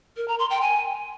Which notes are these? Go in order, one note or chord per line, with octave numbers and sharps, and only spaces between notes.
A#4
A#5
C6
G5
G#5